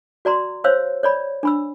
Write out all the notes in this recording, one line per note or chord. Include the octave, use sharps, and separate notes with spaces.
F#4 D5 A#5 C6
C5 C#5 F5 E6
C#5 D5 B5
D4 B5 E6